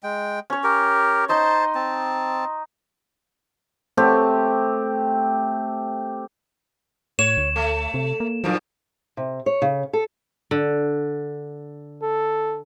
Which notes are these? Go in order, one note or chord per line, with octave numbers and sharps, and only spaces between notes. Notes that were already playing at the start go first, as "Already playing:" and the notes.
G#3 G5
C#4 C#5
G4 A#4
D#4 C5 D#5 A5 C6
C4 A5
A3 C4 G4
A2 C#5 E7
D2
A3
C3
A#3
G2 A#2 F3 F#3
C3
C#5
C#3
A4
D3
A4